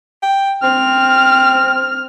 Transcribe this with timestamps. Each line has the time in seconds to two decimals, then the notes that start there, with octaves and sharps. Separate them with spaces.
0.22 G5
0.63 C4 F6